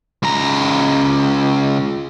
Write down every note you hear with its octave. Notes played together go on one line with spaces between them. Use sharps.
C#2 A#5